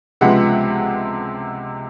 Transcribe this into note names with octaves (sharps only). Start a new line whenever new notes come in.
C#2 C3 F3 G#3 B3 E5 F#5